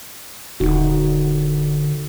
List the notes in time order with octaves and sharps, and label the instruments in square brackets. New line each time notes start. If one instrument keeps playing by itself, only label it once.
[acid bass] D#1 [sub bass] D3 [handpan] D#4 F#4